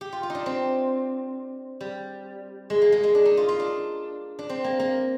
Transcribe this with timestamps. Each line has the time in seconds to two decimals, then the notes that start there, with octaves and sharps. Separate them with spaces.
0.01 G4
0.12 F4
0.23 F4
0.30 D#4
0.35 D4
0.46 C4
1.81 G3
2.70 G#3
2.82 A#3
2.92 G#3
3.03 G#3
3.15 D4
3.25 D#4
3.37 F4
3.49 F4
3.60 D4
4.39 D4
4.49 C4
4.64 A#3
4.80 A#3